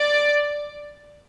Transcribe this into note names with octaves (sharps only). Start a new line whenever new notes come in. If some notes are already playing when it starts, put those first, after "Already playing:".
Already playing: D5